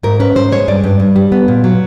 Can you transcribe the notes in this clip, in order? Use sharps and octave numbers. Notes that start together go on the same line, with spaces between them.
G#2 A#4
C#4 B4
G#2 C5
G#3 C#5
G2 D5
G2
G2
G3
B3
A#2
F#3